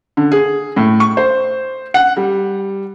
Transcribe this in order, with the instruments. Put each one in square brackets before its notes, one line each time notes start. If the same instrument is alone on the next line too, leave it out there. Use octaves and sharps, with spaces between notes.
[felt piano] D3
G#4
A2
C#6
C5
F#5
G3